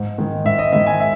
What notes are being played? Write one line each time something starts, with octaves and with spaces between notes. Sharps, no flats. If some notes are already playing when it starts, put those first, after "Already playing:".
Already playing: G#2
D#3 G#3
G#2 E5
D#5
D#3 G#3 E5
G#5
E5